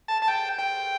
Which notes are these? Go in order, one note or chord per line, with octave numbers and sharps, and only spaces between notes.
A5
A5
G5
G5